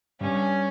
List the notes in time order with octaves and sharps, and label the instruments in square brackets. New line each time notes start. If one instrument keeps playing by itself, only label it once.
[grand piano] G2 [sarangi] C#4